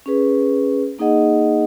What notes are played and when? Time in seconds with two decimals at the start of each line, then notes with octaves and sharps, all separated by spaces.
0.06 C#4 G#4 B4
0.99 A#3 D#4 G#4 D#5 F#5